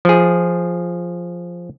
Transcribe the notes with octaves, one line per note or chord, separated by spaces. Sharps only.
F3 G#4